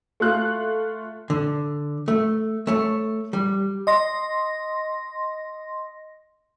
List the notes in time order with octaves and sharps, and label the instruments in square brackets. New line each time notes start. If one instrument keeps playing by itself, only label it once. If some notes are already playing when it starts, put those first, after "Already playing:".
[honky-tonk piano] A3 F4 F#6
[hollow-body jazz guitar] D3
A3
A3 C#5
G3
[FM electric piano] D#5 C6 A#6